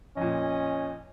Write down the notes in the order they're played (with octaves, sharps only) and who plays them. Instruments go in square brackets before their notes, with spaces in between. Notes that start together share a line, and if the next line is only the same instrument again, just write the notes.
[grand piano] F2 A#2 [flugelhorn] C#4 [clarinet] D#5